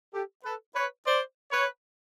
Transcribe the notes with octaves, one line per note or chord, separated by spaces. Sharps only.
G4 A4
A4 B4
B4 C#5
C5 D5
B4 C#5